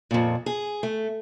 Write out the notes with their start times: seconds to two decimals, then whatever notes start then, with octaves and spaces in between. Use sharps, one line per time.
0.11 F2 A#2
0.46 G#4
0.83 A3